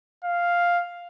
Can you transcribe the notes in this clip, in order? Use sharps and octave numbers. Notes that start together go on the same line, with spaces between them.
F5